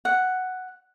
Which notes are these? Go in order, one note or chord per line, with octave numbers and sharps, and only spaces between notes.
F#5